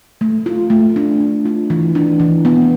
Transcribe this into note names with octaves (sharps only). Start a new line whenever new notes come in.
A3
F4
A3
D4
A3
F4
E3
D4
E3
B3